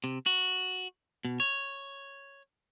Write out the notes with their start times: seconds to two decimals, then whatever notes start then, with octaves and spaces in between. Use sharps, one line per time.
0.04 C3
0.26 F#4
1.25 B2
1.40 C#5